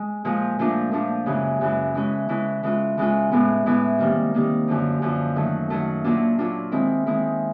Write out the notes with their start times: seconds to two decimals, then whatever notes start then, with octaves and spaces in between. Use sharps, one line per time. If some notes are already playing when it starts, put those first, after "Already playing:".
Already playing: G#3
0.25 A#2 F3 G#3
0.59 A#2 F3 A3 D4 F4
0.92 A#2 F3 A3 D4 F4
1.26 F#2 C#3 E3 G#3
1.61 F#2 C#3 E3 G#3
1.95 E3 G#3 C#4 E4
2.29 E3 G#3 C#4 E4
2.63 E3 G#3 C#4 F4
2.98 E3 G#3 C#4 F4
3.32 A2 E3 G#3 B3
3.66 A2 E3 G#3 B3
3.98 C3 D#3 G3 A#3
4.34 C3 D#3 G3 A#3
4.68 F#2 D3 F3
5.02 F#2 D3 F3
5.36 D#3 F#3 A3
5.70 D#3 F#3 A3
6.04 A#2 F#3 A#3 D4 F4
6.38 A#2 F#3 A#3 D4 F4
6.72 D#3 G#3 C4 E4
7.06 D#3 G#3 C4 E4